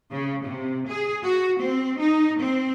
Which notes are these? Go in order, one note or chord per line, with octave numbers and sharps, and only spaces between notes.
C#3
C3
G#4
F#4
C4
D#4
C4